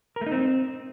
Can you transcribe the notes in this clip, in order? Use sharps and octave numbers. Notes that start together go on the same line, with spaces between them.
A#4
A3
D#4
C4